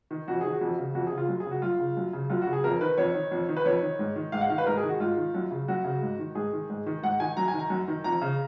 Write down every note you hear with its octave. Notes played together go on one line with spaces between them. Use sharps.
D#3
F2 F#4
D#3 G#4
F#4
F2
C#3
F2 F#4
G#4
C#3
F4
F#2
G#4
C#3
F#4
F#2 F4
C#3
F#2
C#3
F#2 F4
F#4
C#3
G#4
F2 A#4
D#3 B4
F2 C#5
D#3
F2
D#3
B4
F2 C#5
D#3
G#2
D#3
G#2 F5
F#5
D#3 F5
B4
G#2 A#4
G#4
D#3
F#4
G#2 F4
D#3
F#2
C#3
F#2 F#4
C#3
G#2
D#3
G#2 G#4
D#3
G#2
D#3
G#2 F#5
D#3 G#5
F#2 A#5
G#5
D#3
A#5
F#2
D#3
F2 A#5
C#3